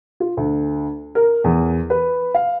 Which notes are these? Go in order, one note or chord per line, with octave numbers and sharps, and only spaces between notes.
F4
D2
A#4
E2
B4
F5